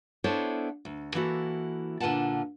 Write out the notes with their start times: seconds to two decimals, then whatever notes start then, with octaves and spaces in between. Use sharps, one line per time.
0.24 B3 D4 E4 A4 C5 C#5
0.85 D2
1.15 E3 A#3 E4 F#4 A4
2.00 A#2 D3 F4 B4 F#5 A5